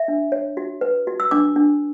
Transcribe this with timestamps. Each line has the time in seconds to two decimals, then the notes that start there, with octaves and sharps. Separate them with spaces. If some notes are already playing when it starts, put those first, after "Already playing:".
Already playing: E5
0.08 D4
0.32 C#5
0.57 F#4
0.81 B4
1.07 F#4
1.20 E6
1.31 D4 D6
1.56 D4